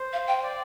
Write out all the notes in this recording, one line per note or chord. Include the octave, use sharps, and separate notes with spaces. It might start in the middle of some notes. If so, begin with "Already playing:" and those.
Already playing: C5
F5
G5
D5